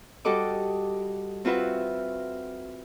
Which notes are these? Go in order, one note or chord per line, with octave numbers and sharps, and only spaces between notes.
G3 F#4 A4 D#5 D6
C4 F4 F#4 B4 E5